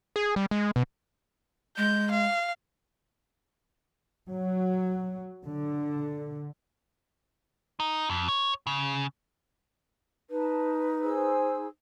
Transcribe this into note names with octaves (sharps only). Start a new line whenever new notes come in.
G#4
G3
G#3
B2
G#3 G6
F5
F#3
D3
D#4
F2
C#5
C#3
D#4 B4 A5
G#4 C5 E6